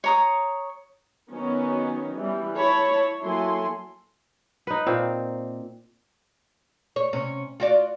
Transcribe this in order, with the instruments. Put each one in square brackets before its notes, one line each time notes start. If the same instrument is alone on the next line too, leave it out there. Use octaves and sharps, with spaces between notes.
[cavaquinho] C#5 A#5 D#6
[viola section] D#3 F#3 B3 C#4 D#4
E3 G3
E4 C#5 A5 B5
F#3 A#3 E4 A4 G#5 C6
[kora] D#4 B4
A#2 C4
[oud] C#5
C3 C#4
F4 F#4 D5